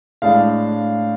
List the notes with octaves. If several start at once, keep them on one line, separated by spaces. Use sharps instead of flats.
A2 G#3 D4 F5